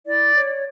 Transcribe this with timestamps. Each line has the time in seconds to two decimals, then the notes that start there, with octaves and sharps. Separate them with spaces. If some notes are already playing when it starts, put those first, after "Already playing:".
0.06 E4 D5
0.35 C#5